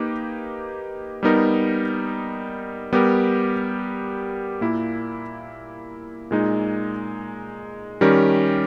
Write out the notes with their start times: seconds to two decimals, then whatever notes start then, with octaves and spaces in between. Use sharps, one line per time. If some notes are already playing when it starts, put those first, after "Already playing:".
Already playing: A#3 D#4 G4 B4
1.23 G3 B3 D#4 A#4
2.93 G3 B3 G4 A#4
4.61 A#2 A#3 E4
6.31 A#2 G#3 D#4
8.01 D#3 G3 C#4 G4 A#4